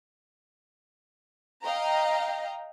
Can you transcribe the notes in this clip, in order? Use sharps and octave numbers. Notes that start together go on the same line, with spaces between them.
D#5 F5 G5 A#5